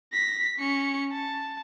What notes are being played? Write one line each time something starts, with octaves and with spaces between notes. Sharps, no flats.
A#6 B6
C#4 C#7
A5